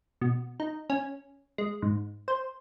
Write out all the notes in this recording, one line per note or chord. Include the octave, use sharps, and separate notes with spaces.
B2
D#4
C#4
G#3
G#2
C5